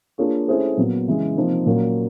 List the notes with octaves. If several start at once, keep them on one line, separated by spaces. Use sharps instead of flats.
A#3 D4 F4 G#4 C#5
A3 C#4 E4 G#4 C5
A#2 F#3 B3
C#3 E3 G#3
C3 F3 A#3 D#4
A#2 F#3 A#3 C#4